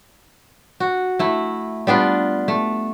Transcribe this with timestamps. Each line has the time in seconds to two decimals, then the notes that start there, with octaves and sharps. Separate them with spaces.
0.80 F#4
1.19 A3 E4
1.87 G3 B3 D4 F4
2.48 A3